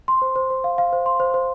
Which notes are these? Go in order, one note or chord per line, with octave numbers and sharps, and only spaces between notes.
C6
C5
C5
C5
F5
F5
C5
C6
C5
C5